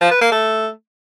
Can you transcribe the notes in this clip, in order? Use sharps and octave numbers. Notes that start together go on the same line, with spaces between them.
F3
B4
A#3
A3